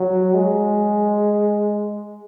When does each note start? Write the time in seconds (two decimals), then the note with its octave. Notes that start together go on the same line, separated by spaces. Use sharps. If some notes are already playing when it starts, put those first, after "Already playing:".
Already playing: F#3
0.34 G#3